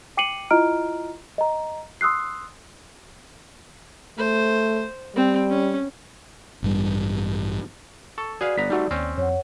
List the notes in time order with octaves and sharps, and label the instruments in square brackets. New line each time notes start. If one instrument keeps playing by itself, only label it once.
[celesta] G5 D6 C7 C#7 D#7 F#7
E4 F4 D#5 A#5 F6 D7
D#5 A#5
C6 D#6 E6 F#6 C7
[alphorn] A3 [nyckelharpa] C5
[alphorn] G3 [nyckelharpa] C4
[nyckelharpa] C#4
[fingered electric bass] A1 G2 G3
[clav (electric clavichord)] A4 [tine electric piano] C#6
[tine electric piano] F#4 [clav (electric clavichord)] G#4 B4 F5 [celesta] D5
[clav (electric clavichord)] G1 B3 A#5 [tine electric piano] B6
[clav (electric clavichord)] G3 A3 C4 [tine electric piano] D#4 F#4
[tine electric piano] D#2 [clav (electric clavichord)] C4 C#4
[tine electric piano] F2 [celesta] C#5 F#5